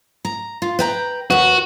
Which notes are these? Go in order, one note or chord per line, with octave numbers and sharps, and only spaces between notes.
A#5
F4
B4 G5 A#5
D#2 F#4 B4